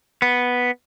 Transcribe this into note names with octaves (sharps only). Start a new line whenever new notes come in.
B3